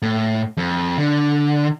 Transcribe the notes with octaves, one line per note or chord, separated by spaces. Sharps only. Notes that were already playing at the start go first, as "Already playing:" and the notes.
A2
F2
D3